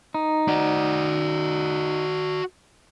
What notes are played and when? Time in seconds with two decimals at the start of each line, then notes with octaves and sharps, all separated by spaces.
0.14 D#4
0.48 F#4 D5